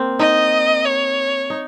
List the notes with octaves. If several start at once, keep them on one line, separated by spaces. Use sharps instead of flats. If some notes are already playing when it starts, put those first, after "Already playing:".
Already playing: A#3 C4
D#4 D#5
C#5
D#4